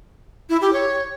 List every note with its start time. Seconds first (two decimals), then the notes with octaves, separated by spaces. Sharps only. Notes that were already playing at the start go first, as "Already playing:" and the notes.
0.50 E4
0.61 G4
0.73 C#5